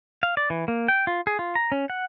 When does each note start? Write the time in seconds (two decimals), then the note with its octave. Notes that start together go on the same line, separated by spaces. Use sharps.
0.23 F5
0.37 D5
0.50 E3
0.68 A#3
0.88 G5
1.07 F4
1.27 G#4
1.39 F4
1.55 A#5
1.72 C#4
1.90 F#5